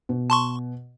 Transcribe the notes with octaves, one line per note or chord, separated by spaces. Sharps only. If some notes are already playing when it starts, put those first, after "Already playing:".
B2
A5 C6 C#6